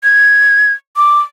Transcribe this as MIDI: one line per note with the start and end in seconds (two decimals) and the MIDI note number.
0.04 0.73 92
0.96 1.20 86